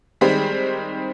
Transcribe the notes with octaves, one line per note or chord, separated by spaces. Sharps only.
D#3 G3 G#3 C4 G4